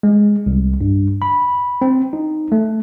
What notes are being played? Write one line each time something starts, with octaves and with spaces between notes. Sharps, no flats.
G#3
C2
G2
B5
C4
D#4
A3